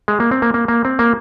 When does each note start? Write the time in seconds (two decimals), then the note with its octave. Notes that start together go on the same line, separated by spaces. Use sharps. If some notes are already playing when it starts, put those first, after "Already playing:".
0.08 G#3
0.20 A#3
0.31 C4
0.42 A#3
0.54 A#3
0.68 A#3
0.85 C4
0.99 A#3